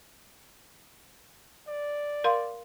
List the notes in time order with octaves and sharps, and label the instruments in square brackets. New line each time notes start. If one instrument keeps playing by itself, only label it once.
[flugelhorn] D5
[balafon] A#4 F5 C6